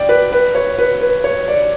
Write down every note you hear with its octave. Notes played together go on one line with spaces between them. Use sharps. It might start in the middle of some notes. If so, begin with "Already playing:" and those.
Already playing: D5 G5
B4
B4
C#5
B4
B4
C#5
D5